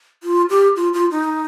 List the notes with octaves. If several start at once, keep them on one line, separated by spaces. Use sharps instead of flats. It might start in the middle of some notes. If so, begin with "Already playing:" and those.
F4
G4
F4
F4
D#4